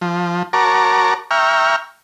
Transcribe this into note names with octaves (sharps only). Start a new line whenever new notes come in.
F3
F#4 A#4 C#5 A5 A#5 D6
E5 G5 A#5 C#6 F6